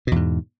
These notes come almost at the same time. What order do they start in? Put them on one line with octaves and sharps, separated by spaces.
B2 E2 G#2